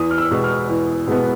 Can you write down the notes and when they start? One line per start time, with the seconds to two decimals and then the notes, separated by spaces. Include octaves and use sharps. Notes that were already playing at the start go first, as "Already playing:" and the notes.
Already playing: E2 D#6
0.11 F6
0.18 E6
0.31 B2 G#3 B3
0.44 F6
0.69 E2
1.08 B2 G#3 B3